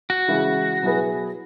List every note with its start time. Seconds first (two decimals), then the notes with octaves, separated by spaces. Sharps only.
0.10 F#4
0.28 C#3 E3 G#3 E4
0.82 B2 F#3 E4 G#4 B4